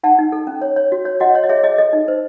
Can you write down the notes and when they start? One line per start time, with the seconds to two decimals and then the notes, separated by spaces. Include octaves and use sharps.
0.03 D#4 F#5 A5
0.19 D#4
0.32 A4
0.47 C#4
0.61 C#5
0.76 C#5
0.92 F#4
1.05 C#5
1.20 F#4 D#5 F#5
1.35 C#5
1.44 D#5
1.49 G#4 C#5 E5
1.63 G#4 D#5
1.78 A4 D#5
1.93 D#4
2.08 C5